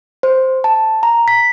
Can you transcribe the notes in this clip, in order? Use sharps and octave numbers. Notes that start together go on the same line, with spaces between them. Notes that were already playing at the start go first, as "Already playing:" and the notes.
C5
A5
A#5
B6